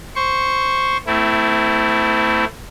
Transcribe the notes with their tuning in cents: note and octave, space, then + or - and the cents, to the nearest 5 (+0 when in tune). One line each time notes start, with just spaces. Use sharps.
C5 +0 C#6 +0
A3 +25 C4 -30 E4 +0